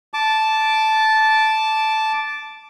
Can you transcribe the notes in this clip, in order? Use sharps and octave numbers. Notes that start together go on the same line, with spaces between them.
A5 D6